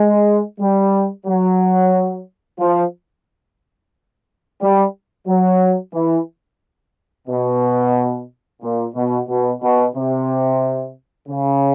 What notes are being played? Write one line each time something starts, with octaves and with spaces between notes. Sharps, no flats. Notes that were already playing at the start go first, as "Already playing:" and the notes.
Already playing: G#3
G3
F#3
F3
G3
F#3
E3
B2
A#2
B2
B2
B2
C3
C#3